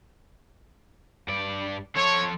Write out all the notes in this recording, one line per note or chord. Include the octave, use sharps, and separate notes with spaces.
G2 D5
F3 A4 C#5